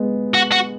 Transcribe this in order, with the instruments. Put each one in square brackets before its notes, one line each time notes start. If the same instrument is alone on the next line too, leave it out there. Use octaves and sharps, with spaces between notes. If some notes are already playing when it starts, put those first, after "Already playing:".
Already playing: [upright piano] G#3 B3
[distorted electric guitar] F#4
F#4